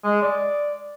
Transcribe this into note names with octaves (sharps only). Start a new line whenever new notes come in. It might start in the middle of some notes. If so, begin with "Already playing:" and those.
G#3
D5